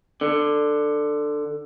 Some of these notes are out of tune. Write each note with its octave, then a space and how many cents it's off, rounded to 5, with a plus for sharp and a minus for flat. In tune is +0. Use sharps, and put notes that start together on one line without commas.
D3 +15